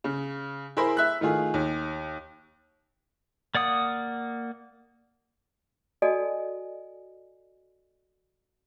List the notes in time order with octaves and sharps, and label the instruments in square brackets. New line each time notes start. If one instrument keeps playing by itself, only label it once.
[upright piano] C#3
E4 G#4 A#4 C5 B5
E5 F#6
D#3 A3 F4 G#4
D#2
[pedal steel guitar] A#3 D5 F#5 D#6
[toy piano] F#4 A4 D5 D#5 G#5 A5